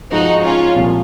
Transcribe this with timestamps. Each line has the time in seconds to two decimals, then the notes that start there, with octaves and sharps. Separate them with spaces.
0.11 G#2 F3 G#3 D#4 F#4
0.44 C#4 F4
0.76 C2 A#2 F3